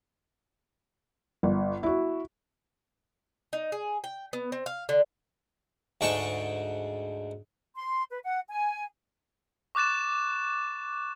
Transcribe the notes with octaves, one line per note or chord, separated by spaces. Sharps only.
G1
E4 F#4
D#4
G#4
G5
B3
C4
F5
D3
D2 G#2 G#3 G5 A5 C#6
C6
B4
F#5
G#5
C#6 D6 F#6 A6 E7